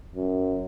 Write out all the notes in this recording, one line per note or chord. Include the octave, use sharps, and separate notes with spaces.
F#2